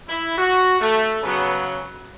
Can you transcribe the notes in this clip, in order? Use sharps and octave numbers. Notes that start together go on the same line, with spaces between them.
E4
F#4
A3
C#3 F#3 B3